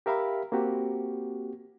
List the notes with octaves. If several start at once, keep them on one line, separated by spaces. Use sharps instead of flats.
G4 A#4 E5 F5 B5
A#3 C4 F#4 G4